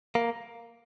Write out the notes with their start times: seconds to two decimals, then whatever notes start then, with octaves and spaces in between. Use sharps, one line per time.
0.15 A#3